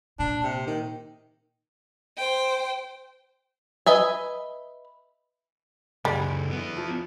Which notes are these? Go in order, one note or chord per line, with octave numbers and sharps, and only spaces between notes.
A#2 D4
C3
D#3
C5 G5
B4 D#5 E5 G#5
C#2 F#2 D3 G3 G#3 G5
B3 E4
F3